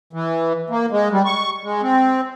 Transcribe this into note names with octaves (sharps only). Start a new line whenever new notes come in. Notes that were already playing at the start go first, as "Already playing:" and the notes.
E3
A#3
G#3
G3
C#6
G#3
C4